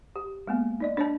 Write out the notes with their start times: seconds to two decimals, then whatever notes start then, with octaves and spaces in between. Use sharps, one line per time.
0.16 G4
0.48 G#3 A#3 B3
0.80 D#4 D5 D#5
0.97 D4 C#5 A5